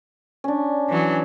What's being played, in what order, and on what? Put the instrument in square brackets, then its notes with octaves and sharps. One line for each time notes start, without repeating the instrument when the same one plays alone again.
[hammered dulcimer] C#4 D4
[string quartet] E3 F#3